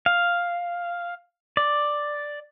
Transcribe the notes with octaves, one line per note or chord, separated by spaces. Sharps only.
F5
D5